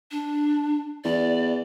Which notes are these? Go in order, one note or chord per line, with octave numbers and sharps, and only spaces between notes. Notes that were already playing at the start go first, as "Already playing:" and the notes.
D4
E2 D5